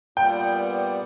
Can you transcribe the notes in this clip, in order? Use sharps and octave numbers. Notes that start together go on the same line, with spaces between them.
A#2 G3 B3 G5